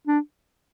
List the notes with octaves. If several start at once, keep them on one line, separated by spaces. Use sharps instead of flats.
D4